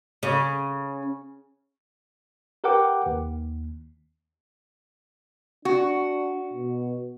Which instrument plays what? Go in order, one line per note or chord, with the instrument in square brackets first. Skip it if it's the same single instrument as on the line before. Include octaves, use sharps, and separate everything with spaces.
[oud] C#3
[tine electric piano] G4 A#4 B4 F#5 G5 D6
D#2
[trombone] D4 [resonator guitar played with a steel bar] F#4
[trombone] B2